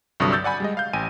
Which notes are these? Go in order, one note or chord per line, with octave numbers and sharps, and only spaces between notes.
C2 G2 D3 F#3 C#6 D#6
E6 G6 A6
D5 F#5 G#5 B5
G3 G#3 D#5
F5 G6
A1 G5 G#5 D#7